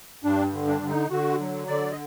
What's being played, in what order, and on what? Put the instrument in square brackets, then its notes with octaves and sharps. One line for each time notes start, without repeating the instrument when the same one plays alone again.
[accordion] G2 D4
D3
D4
D3
D#4
D3 F#4
F#3
D3 D5
D#5